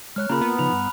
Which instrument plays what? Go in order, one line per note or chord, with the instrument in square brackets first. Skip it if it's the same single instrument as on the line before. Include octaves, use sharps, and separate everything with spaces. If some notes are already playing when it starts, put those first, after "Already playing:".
[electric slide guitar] G#3 C#5 [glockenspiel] F6 F#6
[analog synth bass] C#3 [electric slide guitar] A#3 F4 A#4 [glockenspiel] A#5 B5
[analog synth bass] B3
[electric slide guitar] C#3 F3 D#4 [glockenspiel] B5 F7
[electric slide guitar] G2